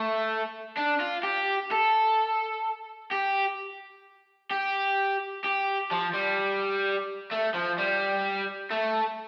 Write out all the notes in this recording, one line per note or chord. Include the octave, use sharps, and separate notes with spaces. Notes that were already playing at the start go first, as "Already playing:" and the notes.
Already playing: A3
D4
F4
G4
A4
G4
G4
G4
F3
G3
A3
F3
G3
A3